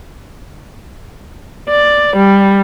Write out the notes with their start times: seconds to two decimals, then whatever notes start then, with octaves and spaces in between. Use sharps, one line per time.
1.69 D5
2.17 G3